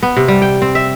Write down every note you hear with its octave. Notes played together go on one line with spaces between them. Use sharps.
B3
C3
G3
G5
C4
E5